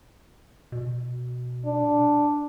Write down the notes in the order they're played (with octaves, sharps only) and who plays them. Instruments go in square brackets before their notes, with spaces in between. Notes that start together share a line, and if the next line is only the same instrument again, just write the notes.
[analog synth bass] B2
[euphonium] D4